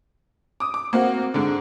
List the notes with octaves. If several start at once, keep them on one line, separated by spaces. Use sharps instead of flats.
D6 D#6
D6
A#3 C4 F#4
G#2 D3